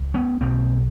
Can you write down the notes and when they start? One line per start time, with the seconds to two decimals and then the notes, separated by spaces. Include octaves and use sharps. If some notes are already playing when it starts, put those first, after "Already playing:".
Already playing: C#2
0.14 B3 C#4
0.41 B1 B2 A#3 C4